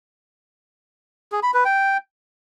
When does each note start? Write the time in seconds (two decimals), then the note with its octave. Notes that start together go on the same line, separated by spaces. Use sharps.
1.32 G#4
1.43 B5
1.54 B4
1.65 G5